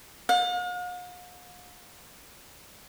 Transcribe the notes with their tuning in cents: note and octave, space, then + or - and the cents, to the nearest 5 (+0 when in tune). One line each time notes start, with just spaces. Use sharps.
F5 +45